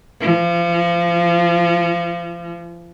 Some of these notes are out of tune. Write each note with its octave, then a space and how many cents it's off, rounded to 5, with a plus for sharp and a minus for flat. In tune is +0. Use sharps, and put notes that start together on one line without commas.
F3 -30